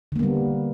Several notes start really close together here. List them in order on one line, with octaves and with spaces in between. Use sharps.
D3 A#3 B3 G3